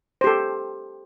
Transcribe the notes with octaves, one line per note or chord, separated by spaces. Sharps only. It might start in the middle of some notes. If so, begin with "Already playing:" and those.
G4 A4 C5